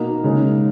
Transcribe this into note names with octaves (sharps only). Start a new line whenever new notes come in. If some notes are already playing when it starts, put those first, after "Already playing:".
Already playing: B2 A#3 D#4
C#3 G#3 D#4